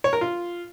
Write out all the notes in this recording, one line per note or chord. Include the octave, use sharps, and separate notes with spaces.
C#5
A#4
F4